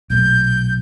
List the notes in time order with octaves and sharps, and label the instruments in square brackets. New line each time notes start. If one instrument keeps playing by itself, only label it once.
[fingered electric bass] B1 A#2 A3 [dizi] G6